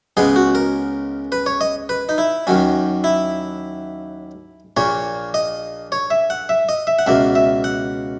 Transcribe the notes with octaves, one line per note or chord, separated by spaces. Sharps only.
C#2 C#3 G#3 B3 G#4
F#4
A#4
B4
C#5
D#5
B4
D#4
E4
D#2 D#3 F#3 C#4
E4
A#1 A#2 A#3 C#5
D#5
C#5
E5
F#5
E5
D#5
E5
F#5
C#2 B2 A#3 E5
E5
F#5